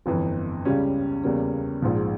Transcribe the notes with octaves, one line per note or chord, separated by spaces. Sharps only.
G1 F2 E3
C#2 C#3 G3 C#4
E2 C#3 G3 A#3 C#4
A#1 G#2 F3